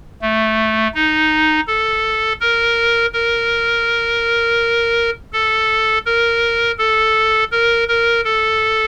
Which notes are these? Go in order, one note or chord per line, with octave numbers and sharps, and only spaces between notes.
A3
D#4
A4
A#4
A#4
A4
A#4
A4
A#4
A#4
A4